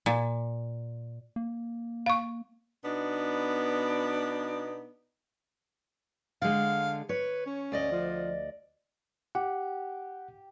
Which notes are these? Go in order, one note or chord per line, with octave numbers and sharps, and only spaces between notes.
A#2
A#3
F5 C#6
B2 B3 D4 D#4
D3 G#3 F5
B4 C#5
C#4
D2 D5 D#5
F3
G4 F#5